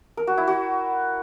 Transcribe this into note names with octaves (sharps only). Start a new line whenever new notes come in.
A#4
F#4
E4
F#4